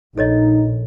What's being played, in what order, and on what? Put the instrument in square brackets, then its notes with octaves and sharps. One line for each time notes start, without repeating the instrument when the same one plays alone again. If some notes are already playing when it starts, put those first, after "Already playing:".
[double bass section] A#1 [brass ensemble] D#4 [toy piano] A4 C#5 D#5